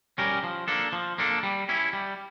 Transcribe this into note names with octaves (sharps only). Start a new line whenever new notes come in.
G3 C#4 G4 A#4
F3
A#3 D4 A4
F3
A#3 D4 A4
G3
C#4 E4
G3